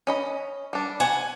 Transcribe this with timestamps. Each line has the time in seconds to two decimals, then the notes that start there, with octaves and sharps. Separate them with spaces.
0.07 C#4 D#5 B5
0.73 G3 D4
1.00 F#5 G#5